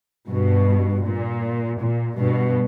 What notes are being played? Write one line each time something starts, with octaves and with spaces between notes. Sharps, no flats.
G2 B2
A#2
A#2
G2 B2